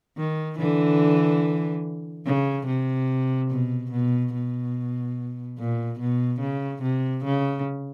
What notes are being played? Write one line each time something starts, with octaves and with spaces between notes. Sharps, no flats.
D#3
D3 E3
C#3
C3
B2
B2
B2
A#2
B2
C#3
C3
C#3